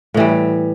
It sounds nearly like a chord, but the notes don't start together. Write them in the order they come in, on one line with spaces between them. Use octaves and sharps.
A2 E3 G3